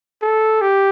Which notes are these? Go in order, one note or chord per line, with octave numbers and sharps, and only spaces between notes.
A4
G4